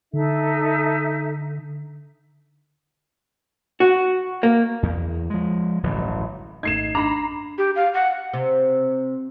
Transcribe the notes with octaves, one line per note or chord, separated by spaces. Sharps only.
D3 D#4 A4 E5
F#4
A#3
E2
F3 G#3
D1 A1 G2 D3
G#1 A3 D#4 G#6 C7 E7
D4 A#5 B5 C7
G4
F5
F#5
C3